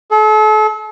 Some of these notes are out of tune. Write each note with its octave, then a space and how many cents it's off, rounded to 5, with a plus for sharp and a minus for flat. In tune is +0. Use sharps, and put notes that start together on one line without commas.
A4 -40